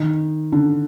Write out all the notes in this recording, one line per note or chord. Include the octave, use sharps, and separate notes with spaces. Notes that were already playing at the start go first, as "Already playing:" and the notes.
Already playing: D#3
D3